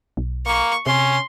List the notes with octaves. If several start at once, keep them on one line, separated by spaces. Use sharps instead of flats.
B1
A#3 C#6
C3 C#4 C6